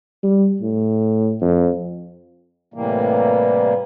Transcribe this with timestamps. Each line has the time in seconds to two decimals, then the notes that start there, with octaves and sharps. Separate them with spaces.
0.23 G3
0.61 A2
1.41 F2
2.74 A2 C3 E3 G3 A#3